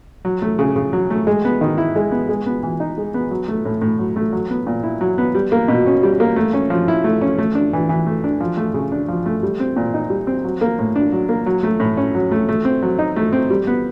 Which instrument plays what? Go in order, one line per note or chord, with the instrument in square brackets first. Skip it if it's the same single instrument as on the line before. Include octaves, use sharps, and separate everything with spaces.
[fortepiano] F#3
A3
C#3
C#3
F#3
A3
G#3
B3
D#3
E4
G#3
B3
G#3
B3
E3
D#4
G#3
B3
F#3
A3
A2
A2
F#3
A3
F#3
B3
A#2
E4
F#3
B3
G3
A#3
B2
C#4
G3
A#3
A3
C#4
F3
E4
A3
C#4
A3
D4
E3
E3
A3
D4
F3
A3
C#3
D4
F3
A3
G3
C4
A#2
D#4
G3
C4
F#3
A#3
A2
D4
F#3
A#3
F#3
A3
A2
C#4
F#3
A3
A3
C4
F#3
D#4
A3
C4
G3
B3